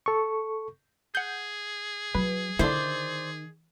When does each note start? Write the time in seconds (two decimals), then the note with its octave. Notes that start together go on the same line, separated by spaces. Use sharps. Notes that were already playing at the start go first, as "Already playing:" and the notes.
0.06 A4 C#6
1.15 G#4 F#5 G6
2.15 F#3 B4
2.59 D3 D#3 E4 C5 D5